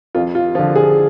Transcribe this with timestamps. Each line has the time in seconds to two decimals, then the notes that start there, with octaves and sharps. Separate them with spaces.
0.15 F2 F4
0.35 F4
0.55 D3 F3 F4
0.76 G#4